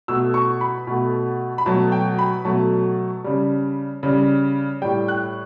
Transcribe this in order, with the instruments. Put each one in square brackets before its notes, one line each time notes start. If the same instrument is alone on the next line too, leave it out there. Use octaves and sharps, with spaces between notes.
[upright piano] B2 A3 E6
C#6
B5
B2 A3
B5
B2 F#3 A3 A5
G5
B5
B2 F#3 A3 A5
C#3 G3
C#3 G3
A2 G3 G5
F#6